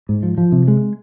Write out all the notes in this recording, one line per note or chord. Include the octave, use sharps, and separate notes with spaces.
G#2
F3
F3
C3
G#3